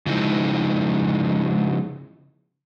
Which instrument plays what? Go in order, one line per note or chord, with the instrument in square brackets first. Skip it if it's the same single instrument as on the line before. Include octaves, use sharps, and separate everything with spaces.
[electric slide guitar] C#3 F3 G#3 D#4 E4